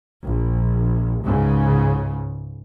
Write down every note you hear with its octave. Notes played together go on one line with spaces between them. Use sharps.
A#1
C#2 G#2 C#3